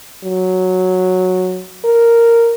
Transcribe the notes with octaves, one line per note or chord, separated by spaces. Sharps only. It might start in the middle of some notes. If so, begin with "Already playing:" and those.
F#3
A#4